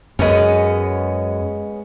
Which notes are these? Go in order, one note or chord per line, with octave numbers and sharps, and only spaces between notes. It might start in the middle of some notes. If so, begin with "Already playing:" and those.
F#2 G#3 B3 C#4